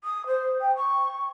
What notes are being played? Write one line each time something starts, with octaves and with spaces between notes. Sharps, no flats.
D#6
C5
G5
C#6